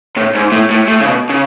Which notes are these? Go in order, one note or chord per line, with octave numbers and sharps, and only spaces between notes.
A2
G#2
A2
A2
A2
C#3
B2
C#3